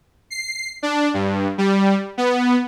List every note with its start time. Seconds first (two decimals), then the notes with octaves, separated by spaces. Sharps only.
0.30 C7
0.83 D4
1.14 G2
1.58 G3
2.17 B3